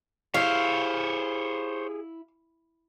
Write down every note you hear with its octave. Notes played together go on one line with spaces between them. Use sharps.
E4 G4 G#4 C5 C#5 F5